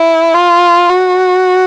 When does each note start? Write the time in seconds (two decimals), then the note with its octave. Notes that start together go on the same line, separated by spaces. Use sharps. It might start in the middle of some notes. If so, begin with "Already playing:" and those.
Already playing: E4
0.34 F4
0.90 F#4